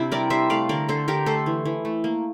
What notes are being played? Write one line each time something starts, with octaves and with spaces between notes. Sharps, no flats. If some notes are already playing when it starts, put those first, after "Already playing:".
Already playing: C3 C4 D4 E4
G3 A#4 D5
G3 C5 E5
A3 D5 F5
D3 A#4 D5
D3 A4 C5
D3 G4 A#4
A3 A4 C5
E3
E3
A3
A#3